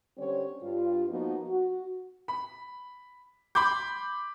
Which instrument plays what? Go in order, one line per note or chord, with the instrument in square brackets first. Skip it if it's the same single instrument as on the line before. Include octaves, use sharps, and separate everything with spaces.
[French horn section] D3 G3 C4 C#4 C#5
G2 F4
F3 A#3 B3 D#4 F#4
F#4
[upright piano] B5
B5 C6 D6 G6